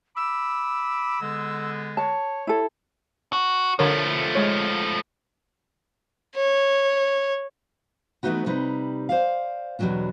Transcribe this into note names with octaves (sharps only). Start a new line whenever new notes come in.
B5 D6 E6
D3 G#3 B3
C#5 A5
E4 A4
F#4
D3 F3 A3 A#4 C#5
G#3 C#5
C#5
E3 F#3 A3 B3 D#4 F#4
C3 G3 D#4 B4
C5 D5 F5
E2 B2 E3 F#3 G3 D4